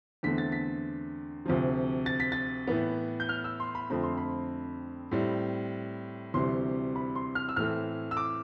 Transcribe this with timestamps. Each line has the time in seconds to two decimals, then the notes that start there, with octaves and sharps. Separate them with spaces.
0.23 E2 D3 A3 C4 B6
0.38 A6
0.52 B6
1.45 D2 C3 F3
2.06 A6
2.20 B6
2.32 A6
2.67 A2 E3 B3
3.20 G6
3.29 F6
3.44 E6
3.60 C6
3.75 B5
3.90 F2 D3 A3 C4 B5
4.03 C6
4.18 B5
5.11 A2 G3 C4
6.34 D2 C3 E3 G3 C6
6.96 B5
7.15 C6
7.35 F6
7.49 E6
7.56 A2 E3 A3 C4 F6
8.11 E6
8.17 D6